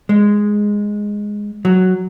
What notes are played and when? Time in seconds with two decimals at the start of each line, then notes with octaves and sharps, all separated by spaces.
0.09 G#3
1.65 F#3